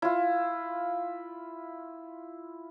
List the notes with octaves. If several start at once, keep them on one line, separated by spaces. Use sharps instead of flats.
E4 F4